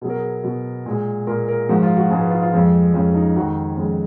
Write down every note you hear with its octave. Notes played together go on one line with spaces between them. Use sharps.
B2 F#3 G#4 A#4
G#4
B2 F#3
A#2 G#3
A#2 G#3 A#4
A#4
G#2 F3 G#3 F#4
F4
F#4
G#2 F3 G#3 G#4
B4
F4
F4
F2 F3 G#3
F2 F3 G#3 C#4
D#4
F2 D#3 G#3 F#4
F2 D#3 G#3 C#4